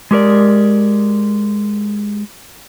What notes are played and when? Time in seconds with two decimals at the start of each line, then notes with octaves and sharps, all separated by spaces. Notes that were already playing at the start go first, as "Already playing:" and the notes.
0.11 G#3 G4 A#4 D5